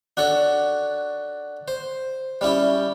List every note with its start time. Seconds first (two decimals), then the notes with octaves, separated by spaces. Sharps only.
0.17 D4 F#4 A4 C#5
1.68 C5
2.41 G3 C#4 E4 G4